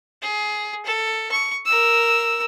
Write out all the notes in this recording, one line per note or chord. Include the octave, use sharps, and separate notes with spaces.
G#4
A4
C#6
A#4 E6